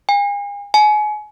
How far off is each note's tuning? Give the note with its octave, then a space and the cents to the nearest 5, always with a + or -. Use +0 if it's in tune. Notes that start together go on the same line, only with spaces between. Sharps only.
G#5 -45
G#5 +30